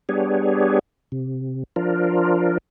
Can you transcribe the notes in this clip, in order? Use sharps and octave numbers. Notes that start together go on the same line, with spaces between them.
G3 B3 D4 G4 G#4 C#5
C3
F3 D4 F4 A#4